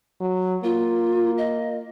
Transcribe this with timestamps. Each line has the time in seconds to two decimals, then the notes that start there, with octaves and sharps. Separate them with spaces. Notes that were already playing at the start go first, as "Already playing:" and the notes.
0.21 F#3
0.64 A#3 F4
1.38 D#5